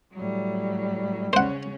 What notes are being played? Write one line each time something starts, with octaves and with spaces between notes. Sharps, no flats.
A2 F#3 G3
C#3 C#4 C5 F#5